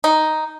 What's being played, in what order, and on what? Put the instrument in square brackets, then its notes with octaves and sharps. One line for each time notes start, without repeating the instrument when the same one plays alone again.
[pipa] D#4